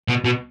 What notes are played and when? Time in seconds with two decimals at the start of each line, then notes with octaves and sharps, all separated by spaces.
0.09 B2
0.25 B2